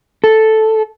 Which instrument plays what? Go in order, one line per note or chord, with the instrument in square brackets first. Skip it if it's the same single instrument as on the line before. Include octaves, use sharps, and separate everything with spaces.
[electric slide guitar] A4